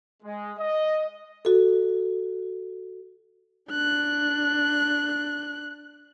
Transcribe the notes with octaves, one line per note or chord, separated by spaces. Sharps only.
G#3
D#5
F#4 A4
D4 F#6